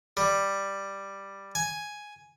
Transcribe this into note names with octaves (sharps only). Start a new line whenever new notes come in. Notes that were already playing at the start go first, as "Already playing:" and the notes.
G3
G#5